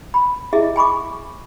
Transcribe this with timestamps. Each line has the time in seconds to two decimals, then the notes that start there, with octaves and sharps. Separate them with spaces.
0.14 B5
0.53 E4 G#4 D#5 E5
0.76 G#5 B5 C#6 D6